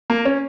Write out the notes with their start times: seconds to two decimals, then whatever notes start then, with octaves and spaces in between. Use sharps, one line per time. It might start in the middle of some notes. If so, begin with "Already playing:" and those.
0.10 A#3
0.25 C#4